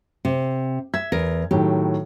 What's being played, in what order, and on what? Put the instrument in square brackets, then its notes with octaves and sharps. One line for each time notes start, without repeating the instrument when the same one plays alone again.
[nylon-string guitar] C3
[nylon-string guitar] E5 [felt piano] G#6
[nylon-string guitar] E2 A#4
[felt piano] A2 D#3 F#3 [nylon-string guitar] G4